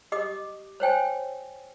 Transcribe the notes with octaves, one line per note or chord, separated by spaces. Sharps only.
G4 D#5 D6 D#6
C5 C#5 G5 G#5